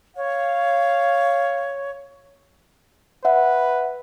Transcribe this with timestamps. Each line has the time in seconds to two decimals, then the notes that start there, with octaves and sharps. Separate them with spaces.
0.17 C#5 F5
3.25 B4 E5 F#5